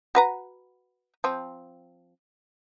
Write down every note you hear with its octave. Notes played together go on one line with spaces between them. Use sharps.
F#4 B4 A#5
F3 C4